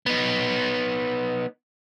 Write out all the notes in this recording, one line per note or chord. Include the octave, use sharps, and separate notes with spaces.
B3 D#4